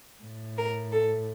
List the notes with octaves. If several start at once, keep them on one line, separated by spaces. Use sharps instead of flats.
A2
A#4
A4